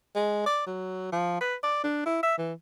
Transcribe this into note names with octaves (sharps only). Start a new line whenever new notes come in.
G#3
D5
F#3
F3
B4
D5
D4
E4
E5
E3